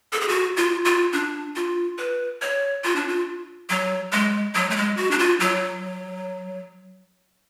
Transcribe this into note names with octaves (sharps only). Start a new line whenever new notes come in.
A4
G#4
F#4
F4
F4
D4
F4
B4
C#5
F4
D4
F4
F#3
G#3
F#3
A3
G#3
F#4
D4
F4
F#3